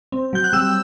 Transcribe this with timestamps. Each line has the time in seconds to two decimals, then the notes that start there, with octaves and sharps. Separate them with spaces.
0.12 C4
0.33 F#3 G6
0.44 F#6
0.53 G3 E6